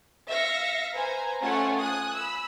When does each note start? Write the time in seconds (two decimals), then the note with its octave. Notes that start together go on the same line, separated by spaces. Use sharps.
0.29 E5 F5 A#6 C#7
0.95 B4 C5 G#5 A#5
1.42 A3 C#4 F4 C#5 F#5 G#5
1.77 G#5 D#6 F#6
2.15 B5 E6